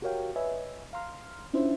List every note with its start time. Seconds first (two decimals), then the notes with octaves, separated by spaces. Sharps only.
0.02 F#4 G4 A#4 C#5 F5 G5
0.36 B4 C#5 D#5 E5 G#5
0.93 F5 A#5 C6 F6
1.54 C#4 D4 E4 F4 C5 E5